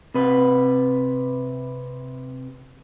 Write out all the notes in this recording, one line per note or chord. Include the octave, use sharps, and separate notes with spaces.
C3 B4